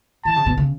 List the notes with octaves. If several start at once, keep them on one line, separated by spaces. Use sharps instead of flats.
E3 A5
C#3
B2
C#3